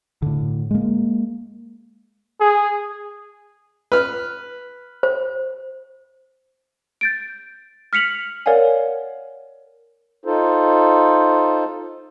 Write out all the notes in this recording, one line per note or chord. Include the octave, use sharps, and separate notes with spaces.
A2 D3
G#3 A#3
G#4
B4 F6
C5
G6 A6 D7
F6 B6 C#7 F7 F#7
A#4 C#5 D5 F5 F#5 G#5
D#4 F4 A4 C5